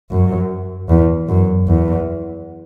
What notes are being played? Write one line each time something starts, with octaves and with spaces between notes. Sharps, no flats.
F#2
E2
F#2
E2